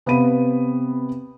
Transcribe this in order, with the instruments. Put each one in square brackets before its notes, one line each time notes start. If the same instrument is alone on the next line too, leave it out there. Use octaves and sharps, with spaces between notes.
[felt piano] C3 B3 B4 F5 B5 D#7